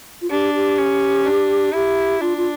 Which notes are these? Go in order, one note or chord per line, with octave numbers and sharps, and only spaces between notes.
F4
D4 G4
G4
C#4
D4
E4 G4
D4 F4
F4